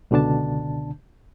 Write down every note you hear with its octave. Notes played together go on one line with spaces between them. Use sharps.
C#2 B2 D3 D4 A5